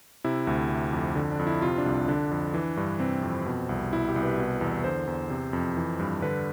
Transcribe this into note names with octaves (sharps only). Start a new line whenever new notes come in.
C3 E4
D2
C3
F2
D3
D4
F2
E4
C3 F4
D4
C2
D3 D4
F2
E3
G2
C3 C4
F2
B2
C2
B2 E4
G4
C2
B4
B2
E2
D3 C5
E2
C3
F2
E3
G2
D3 B4